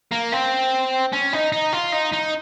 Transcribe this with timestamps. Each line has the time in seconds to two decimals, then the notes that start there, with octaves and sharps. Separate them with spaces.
0.12 A#3
0.33 C4
1.12 C#4
1.33 D#4
1.52 D#4
1.73 F4
1.93 D#4
2.13 D#4